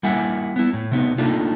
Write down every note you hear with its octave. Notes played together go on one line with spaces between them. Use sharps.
G3 A#3 E4 E5 F#5 G#5
B3 E4
A2
C3 B3 D#4
A3 A#3 D4 D#4 F4